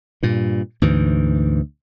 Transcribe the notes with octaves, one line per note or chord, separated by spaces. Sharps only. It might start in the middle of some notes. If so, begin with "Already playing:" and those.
G2 A#2
D2 G#2 E3